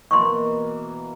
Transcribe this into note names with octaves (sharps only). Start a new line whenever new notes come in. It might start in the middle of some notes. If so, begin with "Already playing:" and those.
B2 E3 A#3 C6 C#6